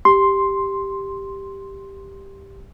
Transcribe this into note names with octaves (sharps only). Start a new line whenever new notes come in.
G4 C6